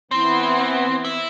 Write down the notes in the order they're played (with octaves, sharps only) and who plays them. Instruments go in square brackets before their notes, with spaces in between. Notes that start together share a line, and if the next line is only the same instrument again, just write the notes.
[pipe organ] E3 B3 E4 [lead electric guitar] C4
[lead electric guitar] E4